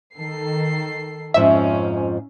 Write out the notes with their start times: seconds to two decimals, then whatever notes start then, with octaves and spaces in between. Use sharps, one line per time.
0.17 D#3 A4 C7
1.34 F2 G#2 F3 C#4 E5